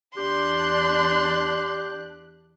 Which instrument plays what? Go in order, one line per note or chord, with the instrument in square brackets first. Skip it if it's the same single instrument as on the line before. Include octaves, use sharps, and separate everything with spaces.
[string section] E2 D4 F#6 [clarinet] G4 [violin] C6